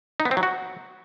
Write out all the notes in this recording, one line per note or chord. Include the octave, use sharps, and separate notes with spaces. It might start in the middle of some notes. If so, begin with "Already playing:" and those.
D#4
B3
C4
F#3
F#4